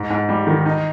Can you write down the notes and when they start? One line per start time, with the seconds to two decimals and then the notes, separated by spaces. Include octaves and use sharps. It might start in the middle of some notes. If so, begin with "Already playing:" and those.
Already playing: G#2
0.10 G#2
0.29 G3
0.47 D#3
0.66 D#4